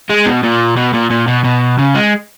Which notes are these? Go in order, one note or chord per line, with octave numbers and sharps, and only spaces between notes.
G#3
B2
A#2
B2
A#2
A#2
B2
B2
C#3
G#3